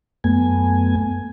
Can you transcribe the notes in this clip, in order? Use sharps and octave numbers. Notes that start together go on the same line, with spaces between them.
F#2 A3 B3 G#5